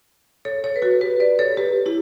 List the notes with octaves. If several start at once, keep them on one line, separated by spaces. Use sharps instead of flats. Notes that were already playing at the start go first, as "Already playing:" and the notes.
A4 C#5
A4 C#5
B4
F#4 A4
G4 B4
B4 D5
A4 C#5
G4 B4
E4 G4